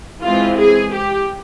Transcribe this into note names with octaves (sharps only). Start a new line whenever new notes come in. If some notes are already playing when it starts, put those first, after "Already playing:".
E3 G#3 C4 F4
G#4
G4